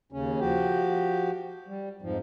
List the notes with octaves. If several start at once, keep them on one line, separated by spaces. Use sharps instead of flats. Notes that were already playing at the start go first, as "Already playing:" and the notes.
D#2 C#3 C#4
F3 F#4 G4
G3
F2 G#2 F3